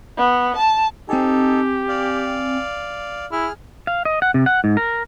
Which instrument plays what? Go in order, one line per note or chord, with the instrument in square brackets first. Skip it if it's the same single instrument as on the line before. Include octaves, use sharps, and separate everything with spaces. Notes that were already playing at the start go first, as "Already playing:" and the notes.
[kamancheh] B3
A5
[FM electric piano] C4 G5 G#5 [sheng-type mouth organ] D#4 A4 [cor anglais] G4
[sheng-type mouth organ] D5 F5
[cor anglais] E4 [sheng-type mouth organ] G#4 F6
[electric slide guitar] F5
D#5
F#5
C3
F#5
G#2
A#4